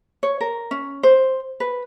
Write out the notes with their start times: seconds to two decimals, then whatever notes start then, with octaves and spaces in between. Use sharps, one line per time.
0.23 C#5
0.41 A#4
0.71 C#4
1.03 C5
1.60 B4